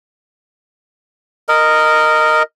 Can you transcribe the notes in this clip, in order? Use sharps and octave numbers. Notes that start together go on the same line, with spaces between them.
A#4 D#5